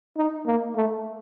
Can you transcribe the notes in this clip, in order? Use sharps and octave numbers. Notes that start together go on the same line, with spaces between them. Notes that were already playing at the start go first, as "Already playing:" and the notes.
D#4
A#3
A3